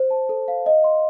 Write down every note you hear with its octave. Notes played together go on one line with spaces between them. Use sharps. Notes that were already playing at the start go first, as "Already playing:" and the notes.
Already playing: C5
A5
A4
F5
D#5
C6